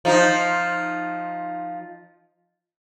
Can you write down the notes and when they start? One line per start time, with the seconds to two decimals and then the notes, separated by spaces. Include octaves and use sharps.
0.05 F3 D#4